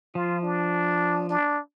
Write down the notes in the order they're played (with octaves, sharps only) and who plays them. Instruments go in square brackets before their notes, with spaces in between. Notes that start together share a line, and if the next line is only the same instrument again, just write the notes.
[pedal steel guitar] F3 [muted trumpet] F4
[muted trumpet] D4
D4